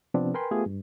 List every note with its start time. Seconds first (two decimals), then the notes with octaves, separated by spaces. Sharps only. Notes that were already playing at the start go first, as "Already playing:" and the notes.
0.14 C3 F3 B3 C4 D4
0.34 A#4 B4 G5 G#5 B5 C6
0.51 A3 B3 F4 G4 G#4
0.66 G2